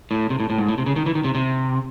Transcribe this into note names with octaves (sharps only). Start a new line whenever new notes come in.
A2
C3
A2
A2
G#2
A2
C3
C#3
D#3
E3
D#3
C3
C3